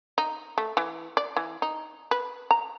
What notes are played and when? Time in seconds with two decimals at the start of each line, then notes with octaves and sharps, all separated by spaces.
0.18 D#4
0.58 A3
0.77 E3
1.17 D5
1.36 E3
1.62 D#4
2.11 B4
2.51 A#5